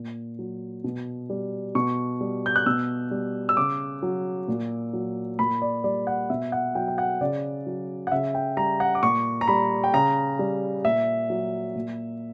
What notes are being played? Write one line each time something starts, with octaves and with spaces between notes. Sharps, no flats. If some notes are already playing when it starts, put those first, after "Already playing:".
Already playing: A#2
F#3
B2
G3
B2 C#6
G3
G6
F#6
B2 E6
G3
E6
C#3 D6
F#3
A#2
F#3
A#2 B5
D5
G3 D5
F#5
B2 E5
F#5
F#3 G5
G5
F#5
C#3 D5
F#3
F#5
C#3 E5
G5
G3 A#5
F#5
D6
A#2 C#6
A#5
G3 B5
G5
C#3 A#5
G3
A#2 E5
F#3
A#2